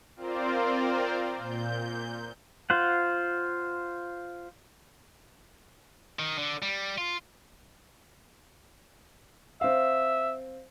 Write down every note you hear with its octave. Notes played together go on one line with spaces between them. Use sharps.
C4 F4 A#4 C5 D5
A#2 G6
F4 C5 F#5
D#3
D3
G3
F4
C4 E5 F5